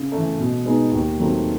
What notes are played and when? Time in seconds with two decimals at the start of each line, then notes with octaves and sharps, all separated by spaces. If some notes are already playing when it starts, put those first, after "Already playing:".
Already playing: C#3
0.12 E3 A3
0.39 B2
0.65 G#3 B3 D#4 G#4
0.92 D#2
1.18 D#3 F#3 A3 C4